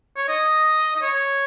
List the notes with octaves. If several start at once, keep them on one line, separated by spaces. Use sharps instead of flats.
C#5
D#5
D#5
C#5